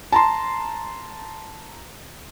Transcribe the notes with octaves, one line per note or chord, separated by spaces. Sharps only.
A5 A#5 C6